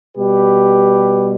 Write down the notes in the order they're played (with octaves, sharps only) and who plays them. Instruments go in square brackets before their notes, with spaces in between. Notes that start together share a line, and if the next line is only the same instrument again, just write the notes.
[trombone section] B2 G3 G4 B4